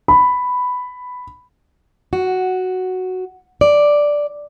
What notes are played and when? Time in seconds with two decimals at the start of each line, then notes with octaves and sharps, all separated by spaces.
0.08 B5
2.13 F#4
3.61 D5